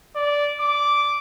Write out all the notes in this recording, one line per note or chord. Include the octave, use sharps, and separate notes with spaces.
D5
D6